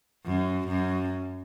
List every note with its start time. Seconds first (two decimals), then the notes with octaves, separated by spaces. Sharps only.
0.26 F#2
0.68 F#2